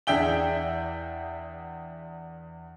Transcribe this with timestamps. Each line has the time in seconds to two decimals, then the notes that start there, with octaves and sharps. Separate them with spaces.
0.07 E2 D4 G#4 E5 G5 G7